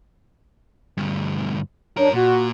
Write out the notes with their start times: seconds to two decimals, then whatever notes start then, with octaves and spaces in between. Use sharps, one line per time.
0.97 D2 G2
1.97 F#2 D4 A#4 C#5
2.13 A#2 F#4